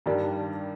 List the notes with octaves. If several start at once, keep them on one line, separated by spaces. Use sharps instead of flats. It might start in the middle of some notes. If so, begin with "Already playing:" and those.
G2 D#3 G3 D4